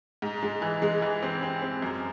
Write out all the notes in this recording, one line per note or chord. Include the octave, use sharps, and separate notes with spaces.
G#2
G#3
E3
G#3
E3
C4
C4
C4
F#2